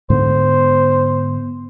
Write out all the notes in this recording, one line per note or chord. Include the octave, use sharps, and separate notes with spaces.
G#2 D3 B3 C5